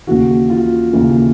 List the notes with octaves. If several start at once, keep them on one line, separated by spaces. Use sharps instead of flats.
D#2 C#3 E3 F#4
F4
D#2 C#3 E3